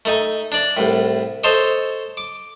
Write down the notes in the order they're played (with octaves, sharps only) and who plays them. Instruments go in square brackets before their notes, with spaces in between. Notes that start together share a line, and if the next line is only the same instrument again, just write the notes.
[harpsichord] A3 D#4 G#5
D4 D5
C2 A2
A4 C5 C#5 D#5
D6